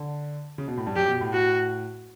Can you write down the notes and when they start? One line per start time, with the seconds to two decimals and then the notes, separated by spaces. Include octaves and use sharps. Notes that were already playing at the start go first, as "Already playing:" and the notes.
Already playing: D3
0.58 C#3
0.68 B2
0.77 A2
0.87 G2
0.96 F#2 G4
1.09 B2
1.21 A2
1.34 F#4